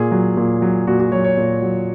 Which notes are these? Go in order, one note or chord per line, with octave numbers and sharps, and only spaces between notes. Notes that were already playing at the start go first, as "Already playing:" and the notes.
Already playing: A#2 G#4
F#3
A#2
F#3
A#2 F#4
F#4
F#3 C#5
C#5
A#2
F#3